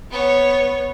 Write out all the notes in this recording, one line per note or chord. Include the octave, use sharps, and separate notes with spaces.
B3 C#5